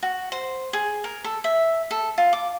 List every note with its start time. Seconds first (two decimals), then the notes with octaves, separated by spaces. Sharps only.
0.03 F#4
0.32 C5
0.73 G#4
1.04 A#4
1.24 A4
1.44 E5
1.91 A4
2.18 F4
2.33 D6